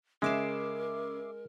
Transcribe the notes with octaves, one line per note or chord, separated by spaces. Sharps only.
C#3 G#3 C#4 A#4 E5 D6 C7 E7